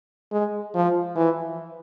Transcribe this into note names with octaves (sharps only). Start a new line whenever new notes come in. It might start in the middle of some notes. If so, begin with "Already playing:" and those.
G#3
F3
E3